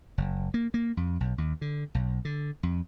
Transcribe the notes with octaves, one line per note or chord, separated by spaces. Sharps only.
F#1
A#3
A#3
F2
B1
D#2
D3
B1
D3
F2